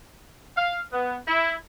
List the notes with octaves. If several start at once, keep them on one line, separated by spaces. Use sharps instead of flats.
F5
B3
E4